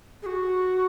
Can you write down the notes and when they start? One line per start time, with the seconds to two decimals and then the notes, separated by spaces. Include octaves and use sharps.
0.22 G#4
0.26 F#4